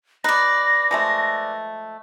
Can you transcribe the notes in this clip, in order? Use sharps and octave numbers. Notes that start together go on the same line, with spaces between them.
D#4 B4 D5 A#6
F3 G#3 A3